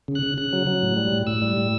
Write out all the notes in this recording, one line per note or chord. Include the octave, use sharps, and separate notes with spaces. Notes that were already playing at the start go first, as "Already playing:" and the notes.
C#3
F#6
C#3
C#3 F#6
F#3
F#3
A2
G3
A2
A2 E6
G3
A2